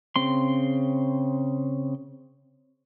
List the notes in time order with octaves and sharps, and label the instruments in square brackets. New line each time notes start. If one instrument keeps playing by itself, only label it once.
[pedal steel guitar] C#3 C4 C6